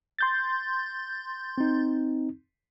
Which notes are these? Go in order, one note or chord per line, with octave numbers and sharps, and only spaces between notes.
C6 G6 A6
C4 D#4